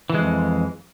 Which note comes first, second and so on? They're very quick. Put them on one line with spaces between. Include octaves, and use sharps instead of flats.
E3 G#3 F2